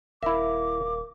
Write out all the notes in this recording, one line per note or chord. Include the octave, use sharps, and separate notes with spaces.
D#1 E4 A#4 E5 F5 D6